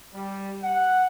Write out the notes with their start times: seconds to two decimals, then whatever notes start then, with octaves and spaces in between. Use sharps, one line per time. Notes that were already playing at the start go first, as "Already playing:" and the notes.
0.13 G3
0.63 F#5